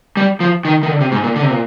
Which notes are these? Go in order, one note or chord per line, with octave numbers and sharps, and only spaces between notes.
G3
F3
D#3
D#3
D3
C3
G#2
A#2
D3
C3
A#2